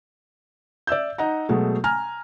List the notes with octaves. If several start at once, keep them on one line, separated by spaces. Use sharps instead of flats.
D5 E5 E6 G6
D#4 D#5 F#5 A#5
B2 F#3 G#3 A3
G#5 A#5 F6